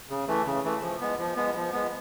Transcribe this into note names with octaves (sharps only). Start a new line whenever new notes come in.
C#3
E3 A3
C#3
E3 A3
F3
G#3 B3
F3
G#3 B3
F3
G#3 B3